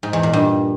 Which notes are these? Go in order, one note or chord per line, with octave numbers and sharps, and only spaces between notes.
G#2
E2
A#2
G2